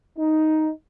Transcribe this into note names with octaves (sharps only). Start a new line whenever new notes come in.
D#4